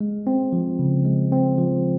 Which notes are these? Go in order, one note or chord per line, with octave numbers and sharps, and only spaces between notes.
G#3
C4
F3
C#3
G#3
C4
F3